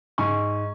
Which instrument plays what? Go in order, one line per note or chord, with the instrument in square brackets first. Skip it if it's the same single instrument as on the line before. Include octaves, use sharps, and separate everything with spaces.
[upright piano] G#2 G#5 C#6